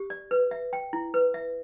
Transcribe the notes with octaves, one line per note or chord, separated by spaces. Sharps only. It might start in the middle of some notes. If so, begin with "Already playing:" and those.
Already playing: G4
D5
B4
E5
G5
E4
B4
E5